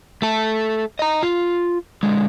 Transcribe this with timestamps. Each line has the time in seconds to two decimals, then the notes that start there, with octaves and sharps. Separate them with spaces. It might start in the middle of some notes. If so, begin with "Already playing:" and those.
0.22 A3 A4
0.99 D#5 A#5
1.23 F4
2.03 D3 G#3